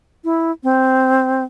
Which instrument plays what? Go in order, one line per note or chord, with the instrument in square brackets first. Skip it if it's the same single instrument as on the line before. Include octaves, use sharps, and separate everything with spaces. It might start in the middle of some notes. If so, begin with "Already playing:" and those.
[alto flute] E4
C4